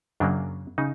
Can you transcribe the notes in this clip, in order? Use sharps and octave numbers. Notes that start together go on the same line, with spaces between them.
F#2 C#3 F#3 A#3 D4
C#3 D#4